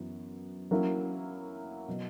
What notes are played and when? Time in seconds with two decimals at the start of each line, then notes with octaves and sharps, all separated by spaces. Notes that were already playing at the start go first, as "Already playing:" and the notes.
Already playing: F#2 E3 B3 F#4
0.71 F#3 A#3 C#4 E4
1.88 B2 F#3